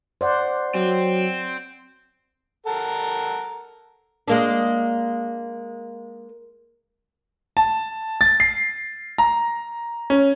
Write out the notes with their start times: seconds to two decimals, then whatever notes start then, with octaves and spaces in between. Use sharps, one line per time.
0.21 C5 D5 F#5
0.75 F#3 C4
2.67 A4 A#4 F#5
4.28 G#3 A#3 D4
7.57 A5
8.21 A6
8.40 C7
9.18 A#5
10.10 C#4